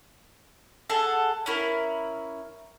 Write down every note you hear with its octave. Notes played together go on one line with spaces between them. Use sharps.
G#4 A4 F#5 A5
C#4 E4 A#4